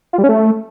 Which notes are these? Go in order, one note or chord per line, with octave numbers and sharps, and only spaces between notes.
F4
G3
C#4
A3